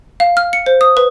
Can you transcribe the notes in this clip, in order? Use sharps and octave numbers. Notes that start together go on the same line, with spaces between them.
F5
F6
C#7
C5
D#6
B4